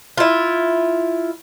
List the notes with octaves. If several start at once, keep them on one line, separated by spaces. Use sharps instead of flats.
E4 F4